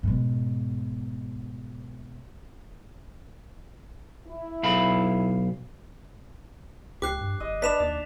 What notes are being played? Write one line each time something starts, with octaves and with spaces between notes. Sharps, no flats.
G#2 B2
E4
B1 F5 B5
C#2 G4 D6 F#6 C7
G2
F#1 D#5
D4 B4 D5 B6 E7 F7
D#2 D5